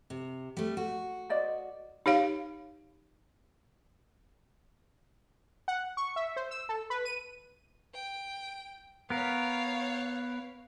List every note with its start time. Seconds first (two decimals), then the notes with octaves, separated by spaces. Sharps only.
0.10 C3
0.57 G3 A3
0.77 F#4
1.30 C5 D5 D#5
2.06 D#4 G4 C#5 F5
5.68 F#5
5.97 C#6
6.16 E5
6.36 C5
6.51 E6
6.69 A4
6.90 B4
7.05 D#7
7.94 G5
9.10 B3 A#4 C#5 F5